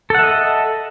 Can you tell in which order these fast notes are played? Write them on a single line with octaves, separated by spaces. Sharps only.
A4 F#5 E5 D#5